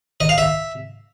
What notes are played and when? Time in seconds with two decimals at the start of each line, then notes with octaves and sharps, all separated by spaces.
0.20 D#5
0.29 F5
0.38 E5